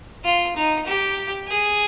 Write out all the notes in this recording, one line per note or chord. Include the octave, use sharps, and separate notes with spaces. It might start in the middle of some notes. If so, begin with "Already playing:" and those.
F4
D#4
G4
G#4